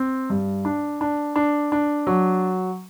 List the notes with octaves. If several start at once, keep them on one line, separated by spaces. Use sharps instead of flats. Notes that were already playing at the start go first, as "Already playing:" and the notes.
Already playing: C4
G2
D4
D4
D4
D4
F#3